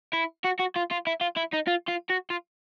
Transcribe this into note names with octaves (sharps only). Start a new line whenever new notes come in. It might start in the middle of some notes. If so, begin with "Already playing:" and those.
E4
F#4
F#4
F4
F4
E4
F4
E4
D#4
F4
F4
F#4
F4